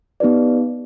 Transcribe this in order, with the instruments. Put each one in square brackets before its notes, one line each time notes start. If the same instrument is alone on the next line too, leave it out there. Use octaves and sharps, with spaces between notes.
[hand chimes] B3 D#4 G4 B4 D5